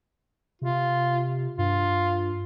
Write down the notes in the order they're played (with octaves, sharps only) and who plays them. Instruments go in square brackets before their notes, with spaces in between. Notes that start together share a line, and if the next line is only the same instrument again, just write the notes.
[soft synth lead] C3 [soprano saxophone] F4
[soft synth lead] G2 [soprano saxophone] F4